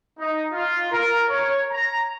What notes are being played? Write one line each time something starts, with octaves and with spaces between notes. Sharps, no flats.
D#4
F4
A#4
C#5
A#5